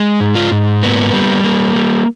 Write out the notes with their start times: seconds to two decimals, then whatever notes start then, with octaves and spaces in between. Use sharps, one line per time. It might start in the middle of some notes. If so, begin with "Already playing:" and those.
Already playing: G#3
0.21 G#2
0.35 F4
0.52 G#2
0.83 A#3 B3
1.13 G3
1.44 A#3
1.75 G3